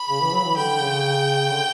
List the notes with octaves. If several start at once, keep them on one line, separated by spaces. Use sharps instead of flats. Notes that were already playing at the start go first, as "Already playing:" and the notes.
Already playing: B5
C#3
E3
F#3
E3
D3 G5
C#3
D3